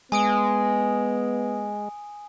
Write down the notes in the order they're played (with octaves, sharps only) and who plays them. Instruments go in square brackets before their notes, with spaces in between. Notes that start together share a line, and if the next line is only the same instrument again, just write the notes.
[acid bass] G#3 [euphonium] B3 [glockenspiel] G#5 D#6 D7